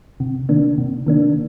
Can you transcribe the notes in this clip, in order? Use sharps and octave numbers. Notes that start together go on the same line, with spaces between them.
C3
D#3 A#3 D4
C3
D#3 A#3 D4